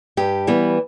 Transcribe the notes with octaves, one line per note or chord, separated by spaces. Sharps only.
G2 G4
E3 G3 B3